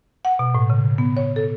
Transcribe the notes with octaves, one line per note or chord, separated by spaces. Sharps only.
F#5
B2
A2
C#3
B3
C#5
A4